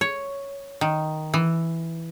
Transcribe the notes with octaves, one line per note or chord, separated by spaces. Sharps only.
C#5
D#3
E3